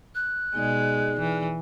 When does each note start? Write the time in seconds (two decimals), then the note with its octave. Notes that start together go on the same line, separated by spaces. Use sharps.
0.15 F#6
0.55 B2 G#3 D#4 G#4 D5
1.20 E3